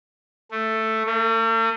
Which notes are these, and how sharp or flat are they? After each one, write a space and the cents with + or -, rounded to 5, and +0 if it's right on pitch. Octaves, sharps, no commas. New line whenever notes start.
A3 +5
A3 +45